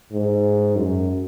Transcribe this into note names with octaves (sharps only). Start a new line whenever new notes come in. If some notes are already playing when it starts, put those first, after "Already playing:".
G#2
F#2